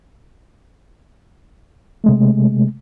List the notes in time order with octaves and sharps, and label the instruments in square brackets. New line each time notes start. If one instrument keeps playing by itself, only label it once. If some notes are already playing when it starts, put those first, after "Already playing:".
[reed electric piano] C3 G#3 A3